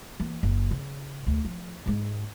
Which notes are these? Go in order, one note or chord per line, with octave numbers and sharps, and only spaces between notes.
E3 A#3
F#1
C#3
D2
F3
G#2 G#3